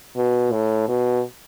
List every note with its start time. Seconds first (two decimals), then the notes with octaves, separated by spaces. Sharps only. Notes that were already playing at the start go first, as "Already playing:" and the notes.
0.16 B2
0.52 A2
0.88 B2